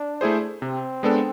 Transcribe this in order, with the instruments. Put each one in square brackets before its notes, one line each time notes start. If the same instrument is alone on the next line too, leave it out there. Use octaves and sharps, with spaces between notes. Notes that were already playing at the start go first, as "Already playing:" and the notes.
Already playing: [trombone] D4
[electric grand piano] A3 E4 G#4 C5
[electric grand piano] C3 [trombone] C4
[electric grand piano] G#3 B3 D4 A4